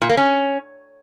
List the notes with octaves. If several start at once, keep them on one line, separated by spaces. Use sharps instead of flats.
A#2
A#3
C#4